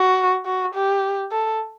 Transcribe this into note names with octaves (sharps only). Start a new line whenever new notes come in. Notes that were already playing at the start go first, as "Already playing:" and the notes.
Already playing: F#4
F#4
G4
A4